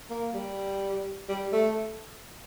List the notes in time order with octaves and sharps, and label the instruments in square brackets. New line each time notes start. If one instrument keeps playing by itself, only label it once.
[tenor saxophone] A#3
G3
G3
A3